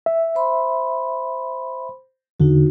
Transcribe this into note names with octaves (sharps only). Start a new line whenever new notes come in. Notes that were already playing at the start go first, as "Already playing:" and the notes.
E5
C5 B5 C6
E2 D3 D#4 F#4